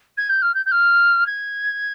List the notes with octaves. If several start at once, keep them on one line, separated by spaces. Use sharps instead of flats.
G#6
G6
F6
G6
G6
F6
G#6